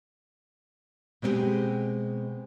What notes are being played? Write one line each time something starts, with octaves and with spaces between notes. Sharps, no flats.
B2 G#3 C4 C#4 G4 G#4